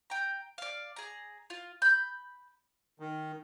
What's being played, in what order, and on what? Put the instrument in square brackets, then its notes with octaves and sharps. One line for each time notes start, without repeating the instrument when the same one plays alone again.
[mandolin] G5 A#5
D5 F5
G#4 A#5
F4
B5 G6
[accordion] D#3